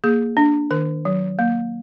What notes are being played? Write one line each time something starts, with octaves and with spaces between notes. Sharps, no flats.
A#3 G#4
D4
D#3 A#4
F#3
A#3